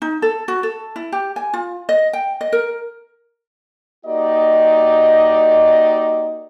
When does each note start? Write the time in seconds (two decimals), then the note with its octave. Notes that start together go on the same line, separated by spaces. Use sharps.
0.02 D#4
0.22 A4
0.48 F#4
0.63 A4
0.96 E4
1.12 G4
1.36 G#5
1.54 F4
1.89 D#5
2.13 G5
2.41 D#5
2.53 A#4
4.06 A#3 D#4 F#4 G4 D5 D#5